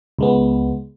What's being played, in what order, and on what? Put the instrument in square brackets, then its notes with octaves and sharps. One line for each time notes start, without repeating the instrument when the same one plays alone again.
[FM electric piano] C#2 G#3 B3